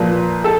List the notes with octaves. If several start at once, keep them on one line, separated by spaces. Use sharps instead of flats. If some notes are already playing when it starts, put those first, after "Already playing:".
Already playing: A#2 F3 B4
A4